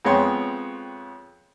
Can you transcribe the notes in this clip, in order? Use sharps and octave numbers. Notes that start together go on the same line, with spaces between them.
F2 G#3 B3 C#5 G5 C6